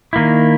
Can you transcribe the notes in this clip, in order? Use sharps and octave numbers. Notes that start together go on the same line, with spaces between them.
D#3 A#3 E4